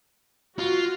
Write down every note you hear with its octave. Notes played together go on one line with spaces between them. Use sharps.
F4 F#4